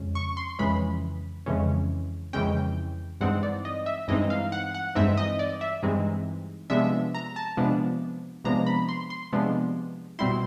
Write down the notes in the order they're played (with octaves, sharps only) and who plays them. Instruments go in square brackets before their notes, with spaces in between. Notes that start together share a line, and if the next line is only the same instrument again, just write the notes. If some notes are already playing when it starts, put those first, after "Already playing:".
Already playing: [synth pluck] F2 C#3 G#3 C#4
C#6
C6
F2 C#3 E3 G#3 C#4 B5
F2 C#3 E3 G#3 C#4
F2 C#3 E3 G#3 C#4 G5
G2 E3 G#3 C4 D#4 F#5
D5
D#5
E5
G2 E3 G#3 C4 D#4 D#5
F5
F#5
F#5
G2 E3 G#3 C4 D#4 E5
D#5
D5
E5
G2 E3 G#3 C4 D#4
C3 F3 G#3 B3 D4 E5
A#5
A5
C3 F3 G#3 B3 D4
C3 F3 G#3 B3 D4 A#5
B5
C6
C6
C3 F3 G#3 B3 D4
B2 G3 C4 E4 C6